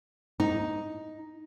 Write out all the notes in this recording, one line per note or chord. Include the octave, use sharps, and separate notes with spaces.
D#4